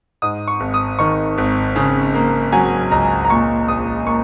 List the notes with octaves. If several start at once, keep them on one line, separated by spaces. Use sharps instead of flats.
G#2 D#6
C#6
G#1
D#6
D#3 C#6
G#1
C#3
A#3
F#3 G#5
C#2 A#5
A#5
A#2 C#6
A#1 D#6
A#3 C#6